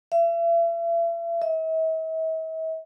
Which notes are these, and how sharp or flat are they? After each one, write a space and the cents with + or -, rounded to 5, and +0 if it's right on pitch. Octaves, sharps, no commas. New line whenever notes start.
E5 +40
E5 -45